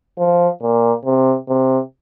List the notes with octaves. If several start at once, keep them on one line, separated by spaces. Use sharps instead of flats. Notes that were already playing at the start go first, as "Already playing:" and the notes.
F3
A#2
C3
C3